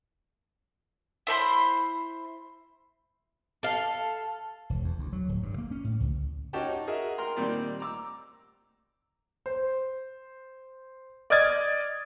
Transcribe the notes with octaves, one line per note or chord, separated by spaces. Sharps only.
E4 C5 B5 C6
A4 F5
E1
E2
D2
F#3
D1
G2
A#3
C#4
A2
C#2
C#4 D#4 F#4 G4 G5 A5
D#4
F#4 G#4 A#4 D#5 E5
A#4 G5 A#5 C6
A#2 D#3 G3 C4 D5
A#5 D6 E6
C5
D5 D#5 D#6 F6 G#6 A6